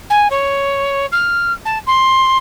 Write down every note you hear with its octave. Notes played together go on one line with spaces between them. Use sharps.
G#5
C#5
F6
A5
C6